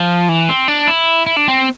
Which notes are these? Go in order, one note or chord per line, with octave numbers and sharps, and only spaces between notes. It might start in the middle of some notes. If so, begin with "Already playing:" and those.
Already playing: F3
E3
C4
D4
E4
E4
D4
C4